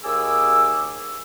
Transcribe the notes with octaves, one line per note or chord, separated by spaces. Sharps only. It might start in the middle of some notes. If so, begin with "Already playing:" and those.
D#2 G#4 G#5 D6 E6